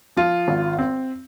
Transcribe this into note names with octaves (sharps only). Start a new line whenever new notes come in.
F3 F4
G#1
C4